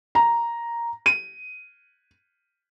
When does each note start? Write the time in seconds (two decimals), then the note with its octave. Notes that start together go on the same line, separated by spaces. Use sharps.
0.15 A#5
1.06 D#7